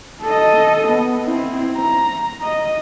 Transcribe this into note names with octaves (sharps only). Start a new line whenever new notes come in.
A4 D#5
B3
C4 E4
A#5
D#5